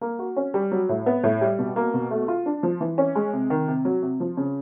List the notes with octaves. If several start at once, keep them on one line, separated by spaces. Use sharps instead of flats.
A#3
F#4
C#4
G3
F#3
A2
B3
A2
G3
B2
A#3
B2
A3
F4
D4
F3
E3
C#4
G#3
C3
D#3
C3
F#3
C3
F3
C#3